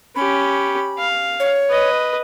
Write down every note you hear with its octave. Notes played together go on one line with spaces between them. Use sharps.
C#4 G4 B5
F5
C#5
B4 D#5